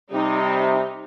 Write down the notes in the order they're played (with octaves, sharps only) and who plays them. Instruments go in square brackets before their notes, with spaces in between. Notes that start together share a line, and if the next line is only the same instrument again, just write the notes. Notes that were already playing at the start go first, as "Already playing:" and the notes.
[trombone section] C3 G3 [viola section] D#4